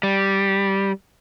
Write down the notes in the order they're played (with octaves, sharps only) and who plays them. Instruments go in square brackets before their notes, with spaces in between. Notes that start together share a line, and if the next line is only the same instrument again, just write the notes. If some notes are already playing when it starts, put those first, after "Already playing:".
[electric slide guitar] G3